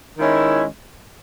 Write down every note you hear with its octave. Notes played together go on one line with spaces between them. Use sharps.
D#3 G#3 C#4 E4